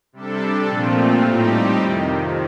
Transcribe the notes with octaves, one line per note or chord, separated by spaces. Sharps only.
C3 G3 D4 A4
A#2 F3 A3 C4 F4
A2 G3 C4 D#4 G4
F2 C3 D#3